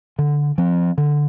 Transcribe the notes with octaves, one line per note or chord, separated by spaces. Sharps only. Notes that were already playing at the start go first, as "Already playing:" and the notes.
D3
F3 C4
D3